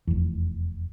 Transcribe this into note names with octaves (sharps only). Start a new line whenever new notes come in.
F1 E2